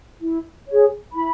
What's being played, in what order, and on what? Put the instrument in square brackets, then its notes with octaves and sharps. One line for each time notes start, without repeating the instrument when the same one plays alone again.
[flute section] E4
G#4 C#5
E4 B5